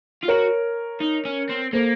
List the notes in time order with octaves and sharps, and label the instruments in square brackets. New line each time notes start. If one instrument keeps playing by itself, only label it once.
[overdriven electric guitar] F4
[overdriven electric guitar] F#4 [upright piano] A#4 C#5
[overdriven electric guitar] D#4
C#4
C4
[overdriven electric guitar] A#3 [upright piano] A4 C5